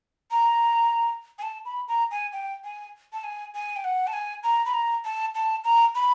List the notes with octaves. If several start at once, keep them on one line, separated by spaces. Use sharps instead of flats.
A#5
G#5
A5
B5
A#5
G#5
G5
G#5
A5
G#5
G#5
G5
F#5
A5
G#5
A#5
B5
A#5
A5
A5
A#5
B5